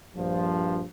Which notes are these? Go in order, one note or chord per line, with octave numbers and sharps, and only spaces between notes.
A#1 G2 F3